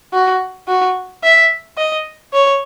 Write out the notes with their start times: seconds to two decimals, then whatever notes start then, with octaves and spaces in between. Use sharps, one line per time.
0.13 F#4
0.68 F#4
1.23 E5
1.78 D#5
2.33 C#5